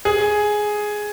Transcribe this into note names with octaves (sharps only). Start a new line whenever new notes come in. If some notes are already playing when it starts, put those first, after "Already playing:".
G#4